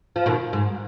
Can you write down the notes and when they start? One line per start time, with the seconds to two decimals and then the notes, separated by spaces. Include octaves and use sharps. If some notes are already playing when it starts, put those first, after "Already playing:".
0.16 F3
0.26 B2 D#3
0.53 G#2